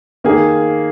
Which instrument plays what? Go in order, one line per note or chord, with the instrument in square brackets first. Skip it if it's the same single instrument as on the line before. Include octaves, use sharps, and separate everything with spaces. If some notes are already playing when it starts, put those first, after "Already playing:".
[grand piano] D#3 A#3 G#4